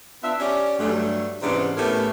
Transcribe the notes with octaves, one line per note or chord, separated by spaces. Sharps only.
B3 D4 F4 E5
C#4 G4 D5
G2 F#3 G3 A3
G#2 C3 E3 B3 C#4 D4
A2 A3 B3 C#4 G4 A#4